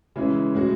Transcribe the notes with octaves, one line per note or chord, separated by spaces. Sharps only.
C#3 E3 G#3 C#4 E4
A2 G#3 C#4 F#4